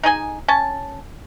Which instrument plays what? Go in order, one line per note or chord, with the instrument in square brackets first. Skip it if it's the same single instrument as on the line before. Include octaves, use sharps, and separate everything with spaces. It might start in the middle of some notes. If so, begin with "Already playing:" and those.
[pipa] D#4 G#4 D#5 G#5
C#4 A5